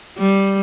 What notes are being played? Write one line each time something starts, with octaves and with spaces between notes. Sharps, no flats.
G3